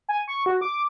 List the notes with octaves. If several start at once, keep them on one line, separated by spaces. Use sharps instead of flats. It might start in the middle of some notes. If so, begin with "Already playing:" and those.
G#5
C#6
F#4
D6